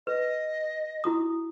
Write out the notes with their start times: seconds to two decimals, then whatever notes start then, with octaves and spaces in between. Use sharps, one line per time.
0.07 B4 D#5
1.04 E4 F#4 D#6